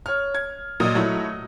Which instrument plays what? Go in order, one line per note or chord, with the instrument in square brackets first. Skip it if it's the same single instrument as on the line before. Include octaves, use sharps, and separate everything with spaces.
[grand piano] C#5 F6
G#6
[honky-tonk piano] A#2 F#3 [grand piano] D#5 D#6
[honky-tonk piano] F#3 A3 E4